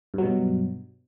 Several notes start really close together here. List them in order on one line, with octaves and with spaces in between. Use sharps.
G2 F#3 B2